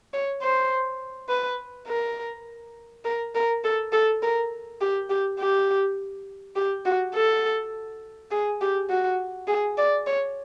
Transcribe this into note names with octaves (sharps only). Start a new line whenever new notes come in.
C#5
C5
B4
A#4
A#4
A#4
A4
A4
A#4
G4
G4
G4
G4
F#4
A4
G#4
G4
F#4
G#4
D5
C#5